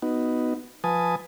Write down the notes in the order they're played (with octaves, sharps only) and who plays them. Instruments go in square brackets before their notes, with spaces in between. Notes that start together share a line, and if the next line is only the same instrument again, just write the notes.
[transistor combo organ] B3 D#4 F#4
F3 B4 G#5 A5 D#6